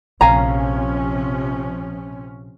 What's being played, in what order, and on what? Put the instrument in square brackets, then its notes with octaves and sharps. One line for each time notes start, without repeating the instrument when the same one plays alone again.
[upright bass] A#1 [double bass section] C3 F3 C#4 [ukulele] F5 G#5 A#5